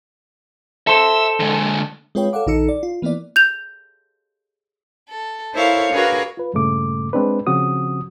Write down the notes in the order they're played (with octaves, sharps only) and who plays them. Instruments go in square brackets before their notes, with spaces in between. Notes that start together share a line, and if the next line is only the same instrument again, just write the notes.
[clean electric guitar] A4 C5 [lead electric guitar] E5
[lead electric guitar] D3 G#3
[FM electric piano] G#3 C4 F4 B4 C#5 G5
A4 C#5 F5 F#5 D6
A#1 D#3 D#4 A4 E6 C#7
D5
F4
E3 A#3 B3 E4 D5
[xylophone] G6 F7
[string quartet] A4
E4 A4 A#4 C5 C#5 F5
D4 F#4 G#4 A#4 B4 F5
[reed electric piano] F4 B4
G2 A#2 C#3 A3 D6
G#3 C4 D4 B4
C#3 F3 C4 F#4 D#6